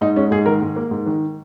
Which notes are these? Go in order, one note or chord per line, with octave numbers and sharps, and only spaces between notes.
G#2 D#4
G#3 C#4
G#2 G#4
D#3 A#4
G#2
A#3
G#2
D#3